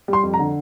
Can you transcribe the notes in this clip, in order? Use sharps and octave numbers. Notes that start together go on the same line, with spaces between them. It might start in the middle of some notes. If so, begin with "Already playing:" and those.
G3
C6
F2
A#5
D3